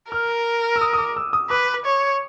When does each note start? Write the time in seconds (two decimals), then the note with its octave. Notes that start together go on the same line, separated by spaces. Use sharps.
0.12 A#4 F6
0.76 E6
0.81 D#6
0.93 D#6
0.98 D6
1.17 E6
1.33 D#6
1.50 B4 D6
1.86 C#5